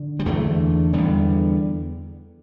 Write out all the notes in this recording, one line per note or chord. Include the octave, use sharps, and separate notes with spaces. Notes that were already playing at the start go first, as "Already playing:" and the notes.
Already playing: D3
G3
E2 D3 E3 A3
E2 D3 G3 B3